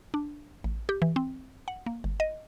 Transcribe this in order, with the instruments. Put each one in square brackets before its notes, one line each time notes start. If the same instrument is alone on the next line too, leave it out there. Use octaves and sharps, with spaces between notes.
[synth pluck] D4
A1
G4
E3
C4
F#5
A#3
G1
D#5